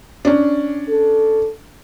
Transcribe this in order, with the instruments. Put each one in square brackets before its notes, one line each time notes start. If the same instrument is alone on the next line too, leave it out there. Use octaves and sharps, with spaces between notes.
[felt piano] C#4 D4
[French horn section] A4